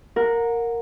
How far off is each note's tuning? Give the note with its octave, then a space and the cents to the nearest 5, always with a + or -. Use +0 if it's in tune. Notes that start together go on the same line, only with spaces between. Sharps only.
A#4 -5 F#5 -30